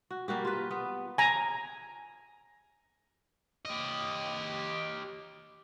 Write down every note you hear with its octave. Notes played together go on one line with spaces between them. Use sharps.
F#4
G3 A#3 F#4 G4
F4 B4
B3
G#5 A#5
G4 D#5